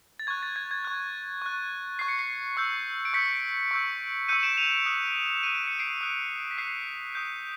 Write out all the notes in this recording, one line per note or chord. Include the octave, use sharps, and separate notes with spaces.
A6
C#6 F#6 G#6
A6
G#6
G#6
C#6 F#6
C#6 F#6
C#6 F#6 C7
C#7
C7
C#6 E6 G6
D7
C#6 E6 G6 B6 C#7
C#6 E6 G6
C#6 E6 G6 C#7 D#7
D7 E7
D#7 F7
D#6 F#6
D#6 F#6 D#7
D7
C#7
C7 D7
D#6 F#6
B6
D#6 F#6 C7
D#6 G6